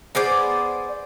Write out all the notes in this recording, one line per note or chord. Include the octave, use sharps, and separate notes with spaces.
B3 G#4 C5 D5